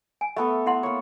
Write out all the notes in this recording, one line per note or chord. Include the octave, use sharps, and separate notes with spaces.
G#5
A3 B3 A4 E5
E4 F#5 C6
A#3 C#5